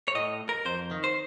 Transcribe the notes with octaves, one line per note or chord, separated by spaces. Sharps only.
C#5
A2 D#5
A#4
F2 C5
D#3
C5